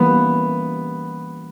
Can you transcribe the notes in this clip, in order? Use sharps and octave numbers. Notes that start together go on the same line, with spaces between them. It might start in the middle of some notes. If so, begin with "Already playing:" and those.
Already playing: E3 G3 A#3 B3 C#4